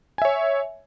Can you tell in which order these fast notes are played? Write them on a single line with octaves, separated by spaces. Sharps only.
G#5 E5 C#5